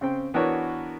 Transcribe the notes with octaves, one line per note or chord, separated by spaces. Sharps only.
C#3 C4 G5
E3 B3 D4 F#4 A#4 C#5